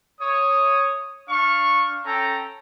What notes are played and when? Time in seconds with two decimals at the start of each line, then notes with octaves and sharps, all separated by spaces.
0.21 C#5 D#6
1.29 D4 F5 C#6
2.05 C#4 A4 G5 A#5